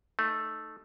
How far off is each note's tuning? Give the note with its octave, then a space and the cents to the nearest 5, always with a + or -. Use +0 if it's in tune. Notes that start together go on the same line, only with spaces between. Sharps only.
A3 +0 D#4 -15